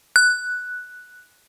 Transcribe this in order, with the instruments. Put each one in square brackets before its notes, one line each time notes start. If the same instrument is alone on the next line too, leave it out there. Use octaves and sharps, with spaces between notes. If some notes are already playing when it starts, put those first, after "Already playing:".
[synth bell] F#6